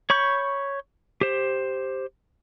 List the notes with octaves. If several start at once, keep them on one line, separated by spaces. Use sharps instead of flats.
C#5 B5 C#6 G6
G4 C5